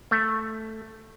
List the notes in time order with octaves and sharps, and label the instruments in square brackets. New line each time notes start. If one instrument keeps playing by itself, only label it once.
[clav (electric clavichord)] A3